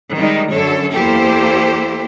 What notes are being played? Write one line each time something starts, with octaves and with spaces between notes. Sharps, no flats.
D#3 G3 G#3 D#4
F#2 D3 A4 C#5
E2 A#3 E4 G4 A4 C5